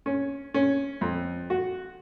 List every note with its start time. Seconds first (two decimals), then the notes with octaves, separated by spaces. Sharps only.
0.06 C#4
0.54 C#4
1.01 F2
1.50 F#4